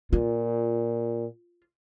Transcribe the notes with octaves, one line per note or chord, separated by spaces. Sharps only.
A#2 F4